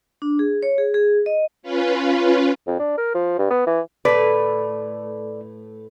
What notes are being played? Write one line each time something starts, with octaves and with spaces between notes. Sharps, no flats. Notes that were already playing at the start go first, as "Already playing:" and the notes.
D4
G#4
C#5
G#4
G#4
D#5
C#4 F4 B4
F2
D4
A#4
F3
G2
B3
E3
A2 A3 A4 B4 D5